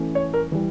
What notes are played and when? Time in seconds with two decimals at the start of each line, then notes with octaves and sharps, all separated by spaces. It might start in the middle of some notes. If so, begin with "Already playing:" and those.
Already playing: E3 A3 C#4
0.15 C#5
0.34 A#4
0.52 E3 G3